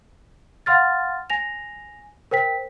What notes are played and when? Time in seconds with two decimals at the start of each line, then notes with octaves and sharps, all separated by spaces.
0.66 F5 F#5 C6 F6 A6
1.30 G#5 A#6 F7
2.31 A#4 C5 G5 B6